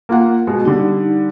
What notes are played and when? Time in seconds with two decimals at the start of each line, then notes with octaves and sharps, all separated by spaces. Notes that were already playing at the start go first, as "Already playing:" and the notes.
0.09 A#3 F4 F#5
0.47 B2 G#3
0.65 D3 G3 D#4